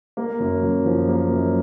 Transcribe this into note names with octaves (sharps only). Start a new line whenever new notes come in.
A#3
F#2
F#2
F3
A#3
F#2